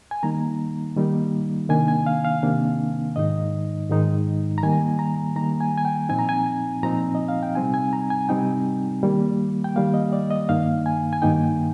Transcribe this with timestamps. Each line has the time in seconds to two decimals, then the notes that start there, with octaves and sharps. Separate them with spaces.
0.11 G#5
0.23 D#3 G3 A#3 D#4 A#5
0.96 D#3 G3 A#3 D#4
1.69 C3 D#3 A#3 D4 G#5
1.88 G#5
2.06 F5
2.25 F5
2.43 C3 D#3 A#3 D4
3.16 G#2 D#3 G#3 D#4 D#5
3.89 G#2 D#3 G#3 D#4
4.58 A#5
4.63 D#3 G3 A#3 G#5
4.99 A#5
5.36 D#3 G3 A#3 A#5
5.61 G#5
5.78 G#5
5.85 G5
6.09 A#2 F3 C4 D#4 G#5
6.19 A#5
6.29 G#5
6.83 A#2 F3 C4 D#4 A#5
7.15 D#5
7.28 F5
7.43 G5
7.55 C3 G3 C4 D#4 G#5
7.74 G#5
7.93 A#5
8.10 G#5
8.29 C3 G3 C4 D#4 G5
9.03 D#3 G3 A#3
9.64 G5
9.76 D#3 G3 A#3 F5
9.94 D#5
10.13 D5
10.31 D#5
10.49 G2 D#3 A#3 D#4 F5
10.86 G#5
11.13 G#5
11.22 G2 D#3 A#3 D#4 G5